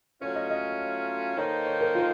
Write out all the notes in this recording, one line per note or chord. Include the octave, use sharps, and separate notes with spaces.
F#3 A3 C#4 F4 C#5
D#5
D#5
D#3 A#3 D#4 A4 C5 C#5
C#5
A#4
F4